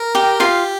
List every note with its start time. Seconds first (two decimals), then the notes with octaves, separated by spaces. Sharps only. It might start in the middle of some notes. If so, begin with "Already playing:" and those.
Already playing: A#4
0.15 G4 G5
0.40 F4 G4 F5